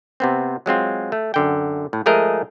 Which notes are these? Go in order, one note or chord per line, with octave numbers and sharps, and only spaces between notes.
C3 B3 C4
F#3 G#3 C4 F4
A3
F#2 D3 G5
A2
F3 G#3 A3 G#4 A#4 D#5